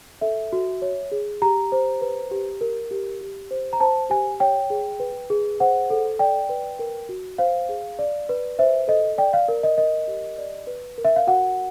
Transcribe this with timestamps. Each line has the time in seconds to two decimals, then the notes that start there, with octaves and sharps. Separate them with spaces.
0.21 A4 E5
0.53 F#4
0.82 C#5
1.12 G#4
1.42 G4 A#5
1.72 C5
2.01 B4
2.31 G4
2.61 A#4
2.91 G4
3.21 G4
3.51 C5
3.73 A#5
3.80 C5 A5
4.10 G4 G#5
4.40 C#5 G5
4.70 G#4
5.00 B4
5.30 G#4
5.60 C5 F#5
5.90 A4
6.19 D5 G5
6.49 B4
6.79 A#4
7.09 F#4
7.38 C5 F5
7.69 G#4
7.99 D5
8.29 B4
8.59 C5 E5
8.88 A4 D#5
9.18 D5 G5
9.33 F5
9.48 A#4
9.63 D#5
9.78 A#4 D#5
10.08 G4
10.38 D5
10.67 B4
10.98 A#4
11.05 E5
11.16 F5
11.27 F#4 F#5